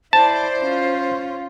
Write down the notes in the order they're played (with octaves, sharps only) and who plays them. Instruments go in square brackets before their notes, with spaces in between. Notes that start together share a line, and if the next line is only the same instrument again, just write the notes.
[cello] E4 D5 [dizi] C5 [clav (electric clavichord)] A5
[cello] C#4 F4